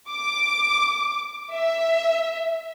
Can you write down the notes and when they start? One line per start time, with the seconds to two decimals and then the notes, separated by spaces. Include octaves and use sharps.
0.11 D6
1.52 E5